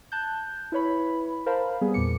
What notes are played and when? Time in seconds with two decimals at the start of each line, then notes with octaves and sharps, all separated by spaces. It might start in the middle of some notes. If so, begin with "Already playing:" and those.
0.12 A5 F#6 G6
0.72 E4 B4 C#5 B5
1.46 A#4 C5 F5 A5 B5
1.81 G3 B3 G#4
1.94 E2 A#2 D6 C#7